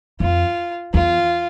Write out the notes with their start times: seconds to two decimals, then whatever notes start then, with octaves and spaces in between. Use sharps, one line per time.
0.20 F2 F4
0.94 E2 F4